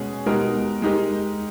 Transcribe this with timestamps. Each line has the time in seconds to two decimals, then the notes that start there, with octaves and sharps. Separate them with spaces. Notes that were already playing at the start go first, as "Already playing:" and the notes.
Already playing: B2 G#3 C#4 G#4
0.26 B2 G#3 D#4 G4 A#4
0.82 G#3 D#4 G4 A#4